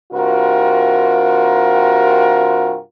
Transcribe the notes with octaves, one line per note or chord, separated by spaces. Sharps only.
G2 C3 F4 F#4 A#4